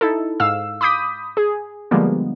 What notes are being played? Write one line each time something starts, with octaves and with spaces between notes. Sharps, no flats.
D#4 E4 A4
G#2 F5 E6
B5 D6 D#6 G6 B6
G#4
D3 F3 G3 G#3 A#3 B3